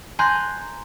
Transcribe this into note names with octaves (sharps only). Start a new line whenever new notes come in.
G#5 A#5 C6 F#6 G6